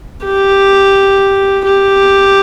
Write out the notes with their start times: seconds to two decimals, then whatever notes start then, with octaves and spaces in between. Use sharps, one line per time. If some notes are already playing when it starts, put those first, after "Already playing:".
0.25 G4
1.65 G4